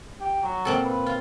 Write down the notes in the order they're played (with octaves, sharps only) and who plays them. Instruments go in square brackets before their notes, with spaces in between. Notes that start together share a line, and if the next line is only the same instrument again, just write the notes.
[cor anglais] G4
F#3
[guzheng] A#2 C4 A4
[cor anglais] B4
[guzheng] F4